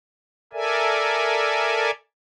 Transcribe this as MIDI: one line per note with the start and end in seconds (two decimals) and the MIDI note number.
0.53 1.91 69
0.53 1.91 70
0.53 1.91 74
0.53 1.91 76
0.53 1.91 80